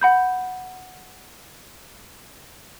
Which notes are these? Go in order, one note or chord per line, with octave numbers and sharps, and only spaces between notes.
F#5 B5 G6